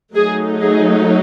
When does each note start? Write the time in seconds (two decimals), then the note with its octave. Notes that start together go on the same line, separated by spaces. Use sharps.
0.15 F#3 A3 D#4 G#4
0.61 G#4